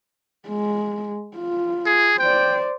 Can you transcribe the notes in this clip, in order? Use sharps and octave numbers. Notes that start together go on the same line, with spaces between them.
G#3
F4
G#4
C5 D5 G5